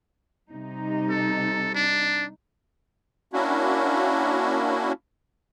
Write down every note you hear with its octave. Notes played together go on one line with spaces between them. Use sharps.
C3 G3 D#4
A4
D4
A#3 C#4 D4 E4 F#4